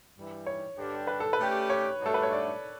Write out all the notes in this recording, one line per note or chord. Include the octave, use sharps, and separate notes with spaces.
G2 E3 G3
C#5
G2 D3 G3 D4 G4
B4
A4
B4
A3 C#4 G4 D5
C#5
G2 F#3 A3 D4 F#4 A4
B4
C#5
D5